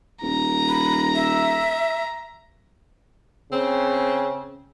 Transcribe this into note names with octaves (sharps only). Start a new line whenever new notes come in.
D#1 A#5
B5
E5
C#3 C4